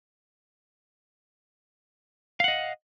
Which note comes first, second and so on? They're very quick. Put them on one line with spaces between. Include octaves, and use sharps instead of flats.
F5 F#5 D#5